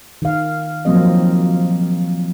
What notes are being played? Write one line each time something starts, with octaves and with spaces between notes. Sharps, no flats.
D#3 F5
F3 F#3 A#3 C4 D#5